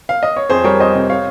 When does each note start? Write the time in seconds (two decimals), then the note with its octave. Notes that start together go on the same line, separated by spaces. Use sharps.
0.09 F5
0.23 D#5
0.37 C#5
0.50 F2 G#4 C5
0.64 G3 A#4 C#5
0.80 F2 C5 D#5
0.95 C3
1.10 C#5 F5